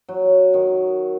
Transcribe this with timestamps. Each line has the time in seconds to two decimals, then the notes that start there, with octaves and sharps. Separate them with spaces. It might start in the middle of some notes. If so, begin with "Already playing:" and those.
0.09 F#3
0.54 D#3